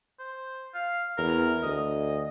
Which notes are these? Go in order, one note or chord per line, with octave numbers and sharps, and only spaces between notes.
C5
F5
E2 A#4
D2 D#5